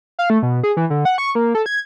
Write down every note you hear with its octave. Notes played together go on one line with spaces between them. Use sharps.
F5
A3
B2
G#4
E3
D3
F#5
C#6
A#3
A4
G#6